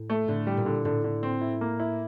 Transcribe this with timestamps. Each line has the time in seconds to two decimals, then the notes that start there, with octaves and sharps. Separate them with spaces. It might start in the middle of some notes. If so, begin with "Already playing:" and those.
Already playing: A2
0.10 A3
0.28 A2 D3
0.47 G3
0.57 A#2
0.66 D3
0.85 A2 D3
1.04 D3
1.23 C4
1.41 E4
1.61 A#3
1.80 E4